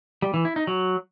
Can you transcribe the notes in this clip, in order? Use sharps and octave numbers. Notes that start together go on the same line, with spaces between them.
G3
E3
E4
D#4
F#3